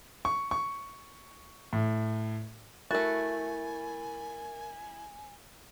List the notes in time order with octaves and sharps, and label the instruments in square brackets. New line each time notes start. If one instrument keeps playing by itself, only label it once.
[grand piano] C#6
C#6
A2
[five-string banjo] A3 F#4 [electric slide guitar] E4 [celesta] A#4 A6 [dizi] G#5